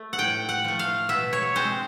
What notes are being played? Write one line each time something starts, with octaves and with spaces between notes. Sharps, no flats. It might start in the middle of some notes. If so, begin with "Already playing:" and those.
Already playing: A3
F#5
A2 G5
F#5
F3 A3
F5
B2 E5
C#5
G#3 C4 C5